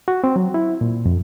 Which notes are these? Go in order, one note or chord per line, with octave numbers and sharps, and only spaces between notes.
F#4
C4
F#3
E4
A#2
F2